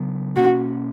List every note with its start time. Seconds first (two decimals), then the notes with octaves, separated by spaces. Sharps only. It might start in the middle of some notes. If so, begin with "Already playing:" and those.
Already playing: C#3 F#3 B3
0.36 B2 A#3 C#4 F#4